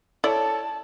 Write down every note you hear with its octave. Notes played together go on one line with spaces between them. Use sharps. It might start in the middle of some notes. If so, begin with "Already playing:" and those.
E4 A4 C#5 D5 A5